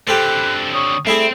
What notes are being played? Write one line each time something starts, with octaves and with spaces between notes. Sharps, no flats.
D3 C4 G4 A4 C5 B5 F#6
C#5 C#6 D#6
A3 C4 E4 G#4 D5